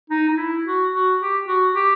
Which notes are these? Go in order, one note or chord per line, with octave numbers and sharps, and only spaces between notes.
D#4
D#4
E4
F#4
F#4
G4
F#4
G4